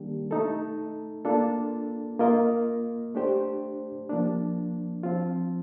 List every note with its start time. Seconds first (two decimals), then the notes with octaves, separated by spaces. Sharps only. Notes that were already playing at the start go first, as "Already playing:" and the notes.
Already playing: D#3 G3 A#3 D4 G4
0.31 A3 D#4 A4
1.25 A#3 D4 F4 A4
2.19 A#3 F4 A#4 D#5
3.15 A3 D4 G4 C5
4.09 F3 A#3 D4
5.03 F3 C4 F4